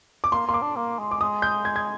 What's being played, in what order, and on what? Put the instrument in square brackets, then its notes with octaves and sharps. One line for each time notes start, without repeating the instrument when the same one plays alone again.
[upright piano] D6
[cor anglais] A#3 [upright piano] C6
[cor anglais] A#3 [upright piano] C6
[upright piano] D6
[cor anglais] D4
A#3
G#3
[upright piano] D6
[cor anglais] G#3 [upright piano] D#6
[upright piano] G6
G#6
G#6